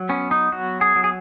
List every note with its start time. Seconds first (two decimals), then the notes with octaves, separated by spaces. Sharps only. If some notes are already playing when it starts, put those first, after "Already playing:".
Already playing: F#3
0.09 B3 C#4
0.31 D#4
0.52 F#3 F#4
0.81 G#4
0.96 F#3
1.04 G#4